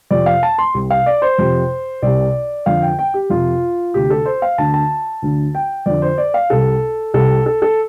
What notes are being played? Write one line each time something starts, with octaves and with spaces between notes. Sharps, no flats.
F2 C3 D5
F5
A5
C6
C2 C3
F5
D5
C5
F2 C3
C2 C3 D5
F2 D3 F5
G5
G5
G4
F2 C3 F4
D2 C3 G4
A4
C5
F5
D2 D3 A5
A5
D2 D3
G5
F2 D3 D5
C5
D5
F5
C2 C3 A4
C2 C3 A4
A4
A4